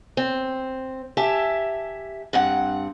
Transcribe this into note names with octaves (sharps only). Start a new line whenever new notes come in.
C4
G4 E5 G#5 A5
G2 C4 F#5